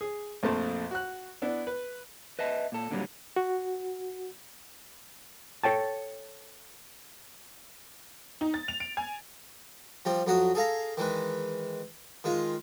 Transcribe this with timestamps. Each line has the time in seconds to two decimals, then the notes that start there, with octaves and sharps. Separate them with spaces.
0.01 G#4
0.43 A#1 F2 A#2 A3 C5 A5
0.91 F#4 F#6
1.42 B3 D4 E4
1.67 B4
2.39 B4 D#5 E5 A5
2.72 A#2 A4
2.91 A#2 D3 D#3 F#3 G3
3.36 F#4
5.63 A4 C#5 G5 A5
8.41 D#4
8.54 A6
8.68 F7
8.80 D7
8.97 G#5
10.05 F3 G3 C4
10.26 F2 F#3 F#4 D#6
10.55 G#4 A4 F5 A#5
10.97 D#3 E3 G#3 B4
12.24 D#3 G#3 F4